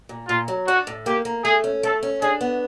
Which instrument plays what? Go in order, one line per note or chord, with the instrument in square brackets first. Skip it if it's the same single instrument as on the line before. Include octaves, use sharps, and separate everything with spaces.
[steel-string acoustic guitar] A#2
[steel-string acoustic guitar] A#2 [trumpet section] F4
[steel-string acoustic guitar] F#3
[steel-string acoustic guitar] D4 [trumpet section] F#4
[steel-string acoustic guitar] A2
[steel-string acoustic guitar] A#3 [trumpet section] G4
[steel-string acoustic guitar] A#3
[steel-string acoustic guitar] A3 [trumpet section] G#4
[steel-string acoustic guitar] C#4
[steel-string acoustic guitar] A3 [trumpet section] A4
[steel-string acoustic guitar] C#4
[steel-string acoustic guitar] D4 [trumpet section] G#4
[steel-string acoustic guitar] B3